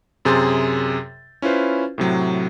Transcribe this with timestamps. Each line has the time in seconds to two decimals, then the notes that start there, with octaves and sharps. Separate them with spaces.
0.25 F#2 C3 G#4 C6 G6 A6
1.42 C#4 E4 F4 B4 C5
1.98 A2 C3 F#3